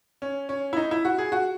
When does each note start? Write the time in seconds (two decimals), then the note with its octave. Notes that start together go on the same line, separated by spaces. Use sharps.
0.22 C#4
0.49 C#4
0.73 E4
0.77 D#4
0.91 E4
1.05 F#4
1.18 G#4
1.32 F#4